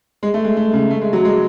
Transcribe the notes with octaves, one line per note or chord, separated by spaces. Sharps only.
G#3
A3
G#3
A3
C#3
A3
G#3
F#3
G#3